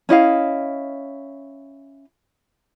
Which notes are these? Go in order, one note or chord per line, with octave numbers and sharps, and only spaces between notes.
C#4 E4 D#5 F5